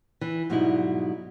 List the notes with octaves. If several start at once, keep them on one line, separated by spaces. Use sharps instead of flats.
E3
G#2 B2 F#3 G3 D#4 E4